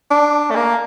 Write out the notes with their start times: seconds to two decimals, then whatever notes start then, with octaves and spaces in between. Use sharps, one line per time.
0.11 D4
0.51 A3
0.56 A#3